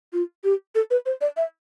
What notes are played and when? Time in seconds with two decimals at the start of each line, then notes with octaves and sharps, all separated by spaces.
0.13 F4
0.44 G4
0.75 A4
0.91 B4
1.06 C5
1.21 D5
1.37 E5